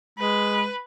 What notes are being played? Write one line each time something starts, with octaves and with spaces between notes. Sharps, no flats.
G#3 B4